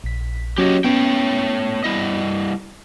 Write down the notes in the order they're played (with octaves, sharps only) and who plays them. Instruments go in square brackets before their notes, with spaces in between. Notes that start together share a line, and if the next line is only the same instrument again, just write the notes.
[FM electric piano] A#1 B6
[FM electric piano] F#3 C#4 F#4 [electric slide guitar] G4 C#5 D#5
[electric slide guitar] A3 C#5 G5 [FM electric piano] B3 C#4
[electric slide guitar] G3 E4 D#5